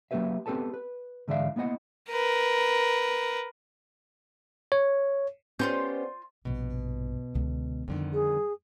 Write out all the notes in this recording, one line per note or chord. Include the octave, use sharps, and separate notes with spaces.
F#3 A#3 C#4 G4 B4 E5
B3 C4 G4 A4 B4 A5
B4
G#2 D3 E3 D5 E5 F5
A#3 B3 E4 D#5 F#5
A#4 B4
C#5
B3 C#4 F4 G4 C5 D5 C6 G6
A#1 G2 B2
C#2 D3
F2 D3 D#3 G3
G#4